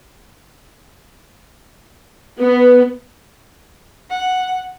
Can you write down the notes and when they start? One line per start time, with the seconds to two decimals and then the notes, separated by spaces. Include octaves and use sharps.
2.40 B3
4.10 F#5